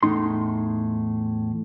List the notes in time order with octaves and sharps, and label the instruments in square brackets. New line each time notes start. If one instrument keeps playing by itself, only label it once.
[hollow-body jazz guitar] E2 A2 D#4 C6